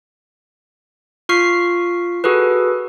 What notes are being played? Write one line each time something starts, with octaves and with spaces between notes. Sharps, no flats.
F4 C#6 F6 B6 C7
F#4 G#4 A4 B4